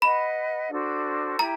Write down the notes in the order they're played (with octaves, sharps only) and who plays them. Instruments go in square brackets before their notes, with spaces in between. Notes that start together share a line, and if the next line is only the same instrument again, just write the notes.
[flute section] B4 D#5 F#5 [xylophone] B5
[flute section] D4 F#4 A4 C5
[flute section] E4 G4 [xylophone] A#5